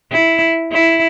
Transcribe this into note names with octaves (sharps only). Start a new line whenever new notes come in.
E4
E4